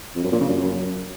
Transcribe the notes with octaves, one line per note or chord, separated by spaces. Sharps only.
F2
F#2
A#2
C#3
F#2